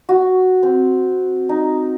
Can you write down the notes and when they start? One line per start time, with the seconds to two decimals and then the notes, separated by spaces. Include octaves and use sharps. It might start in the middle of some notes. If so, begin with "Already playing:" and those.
0.09 F#4
0.63 C4
1.49 D#4